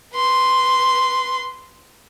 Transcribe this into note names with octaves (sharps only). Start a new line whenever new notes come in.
B4 C6